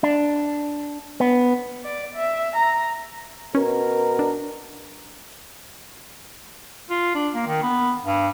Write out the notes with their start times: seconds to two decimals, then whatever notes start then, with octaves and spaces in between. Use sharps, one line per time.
0.03 D4
1.20 B3
1.84 D5
2.15 E5
2.56 A#5
3.55 B2 C#4 A#4
4.19 D4
6.90 F4
7.15 D4
7.34 A#3
7.46 D#3
7.62 B3
8.05 G2